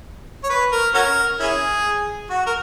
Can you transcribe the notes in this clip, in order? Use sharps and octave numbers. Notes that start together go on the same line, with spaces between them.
C#5
B4
A#4
C#4 F#4 A#4
C#4 E4 G#4
F#4
A#4